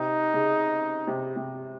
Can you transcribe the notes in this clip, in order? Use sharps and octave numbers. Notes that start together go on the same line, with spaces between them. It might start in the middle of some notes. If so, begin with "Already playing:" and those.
Already playing: C3 D#4
C#3
C3
C3